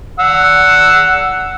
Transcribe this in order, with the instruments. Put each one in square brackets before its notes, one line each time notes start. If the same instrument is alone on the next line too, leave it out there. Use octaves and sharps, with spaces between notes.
[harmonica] F#5 E6